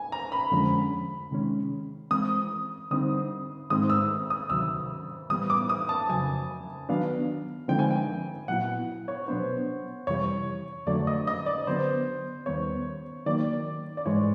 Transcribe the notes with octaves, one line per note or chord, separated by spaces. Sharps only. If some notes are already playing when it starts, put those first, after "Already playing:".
Already playing: G#5
A#5
B5
F2 D3 F3 G#3 C#4
C3 D#3 G#3 C#4
E3 G#3 C4 D#6
D3 G3 C4 D#4 D#6
G#2 D#3 G#3 C4 D#4 D#6
E6
D#6
D2 C3 D#3 F#3 E6
A2 E3 G3 B3 D#6
D6
D#6
A5
F2 C#3 F#3 G#5
D#3 F#3 B3 D4 F5
D3 F3 G#3 C4 D#4 G5
G#5
G5
A#2 F#3 B3 E4 F#5
C#5
B2 F#3 B3 D4 C5
F2 C3 E3 G3 C#5
F2 D3 F#3 A3 D5
D#5
D#5
D5
D3 F#3 B3 C5
D#2 D#3 G3 B3 C#5
D#3 F#3 A#3 D5
D5
G#2 E3 G#3 C#5